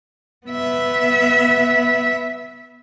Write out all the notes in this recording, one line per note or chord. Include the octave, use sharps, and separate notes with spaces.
B3 E5